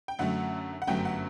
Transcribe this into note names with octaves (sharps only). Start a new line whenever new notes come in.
G5
F#2 D3 F#3 A3 F#5
F#5
G1 F#2 F#3 A3 G5
F#5